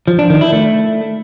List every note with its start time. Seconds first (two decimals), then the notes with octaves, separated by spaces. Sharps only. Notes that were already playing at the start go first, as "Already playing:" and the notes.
0.08 F3
0.19 D4
0.30 D#3
0.41 E4
0.52 A3